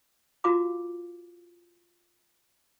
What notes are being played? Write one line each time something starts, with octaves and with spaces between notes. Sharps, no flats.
F4 F#4 F5 A#5 D6